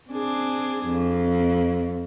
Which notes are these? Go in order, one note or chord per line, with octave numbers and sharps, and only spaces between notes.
C4 D4 G#4
F2